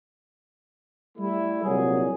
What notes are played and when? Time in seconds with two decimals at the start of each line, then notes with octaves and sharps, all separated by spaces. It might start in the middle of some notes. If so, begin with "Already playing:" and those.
1.18 G3 A3 E4
1.65 C2 A#2 F#3 A#3 G#4